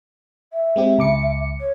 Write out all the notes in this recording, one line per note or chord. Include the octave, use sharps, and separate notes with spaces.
E5
G#3 C4 G4
C#2 D6 C#7
C#5